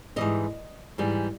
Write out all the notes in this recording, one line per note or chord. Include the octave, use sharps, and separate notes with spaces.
G#2 E3 G3 D#5
G#2 E3 G3